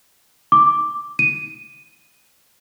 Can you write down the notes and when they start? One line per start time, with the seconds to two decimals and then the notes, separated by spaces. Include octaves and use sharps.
0.52 D6
1.19 D#7